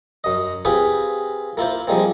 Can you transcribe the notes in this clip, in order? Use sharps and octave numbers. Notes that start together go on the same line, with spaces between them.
F#2 D#5
C4 F4 G4 G#4 B4
A#3 E4 F4 C5
F3 G3 G#3 A#3 C4